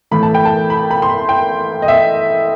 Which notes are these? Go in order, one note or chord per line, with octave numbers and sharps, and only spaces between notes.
A2 E3 A3 B5
A5
G5
A5
B5
B5
C6
B5
G5
D#5
E5